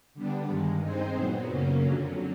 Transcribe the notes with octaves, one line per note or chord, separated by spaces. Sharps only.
D3 G3 B3 D4
G2 D#3 G#3
G#3 C4 D#4 G#4 C5
A#2 F#3 B3
F#2 C#3 F#3 A#3 C#4
F2 D3 F#3